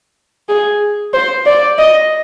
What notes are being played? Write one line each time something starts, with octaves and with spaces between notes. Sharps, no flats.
G#4
C5
D5
D#5